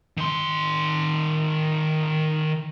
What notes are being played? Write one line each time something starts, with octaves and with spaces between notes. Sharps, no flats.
D#3 C6